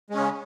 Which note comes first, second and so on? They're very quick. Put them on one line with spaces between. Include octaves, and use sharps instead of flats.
G#3 C#4 C#3